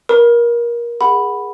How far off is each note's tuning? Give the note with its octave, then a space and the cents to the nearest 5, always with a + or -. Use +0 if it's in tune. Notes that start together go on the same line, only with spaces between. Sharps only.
A#4 +25 B5 -30
G#4 -20 F#5 +0 B5 +0